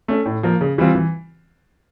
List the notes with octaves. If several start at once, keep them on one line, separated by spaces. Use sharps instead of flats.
A3 C#4
A2
F3 A#3
C#3
E3 G3 C4 F4
E3